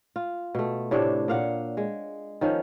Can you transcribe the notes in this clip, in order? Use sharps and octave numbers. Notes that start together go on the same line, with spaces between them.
F4
B2 A3
A2 C3 D4 C#5
A#2 F5 F#5
G#3
D#3 F3 C#4